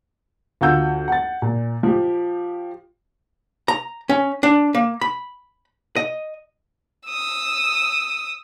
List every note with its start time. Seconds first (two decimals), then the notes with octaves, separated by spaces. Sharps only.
0.61 D2 F4 F#4 F#5 E6 G6
1.08 F#5 A6
1.42 A#2
1.83 F3 G4
3.68 A#5
4.09 C#4
4.43 D4
4.74 A#3
5.01 B5
5.96 D#5
7.08 D#6 E6